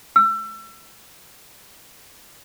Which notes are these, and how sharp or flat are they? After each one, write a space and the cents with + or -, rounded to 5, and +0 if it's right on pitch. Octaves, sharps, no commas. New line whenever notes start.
E6 +30